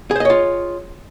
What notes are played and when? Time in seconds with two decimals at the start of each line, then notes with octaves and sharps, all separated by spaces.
0.11 G#4
0.16 C5
0.20 D#5
0.25 C#5
0.30 F4